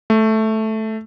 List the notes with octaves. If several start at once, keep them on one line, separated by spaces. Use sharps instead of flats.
A3